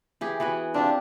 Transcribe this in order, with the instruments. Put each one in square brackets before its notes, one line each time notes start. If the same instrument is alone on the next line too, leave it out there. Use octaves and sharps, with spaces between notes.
[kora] E3 G4 G#4
E3 B3 F#4
[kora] C4 F4 G4 [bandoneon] D4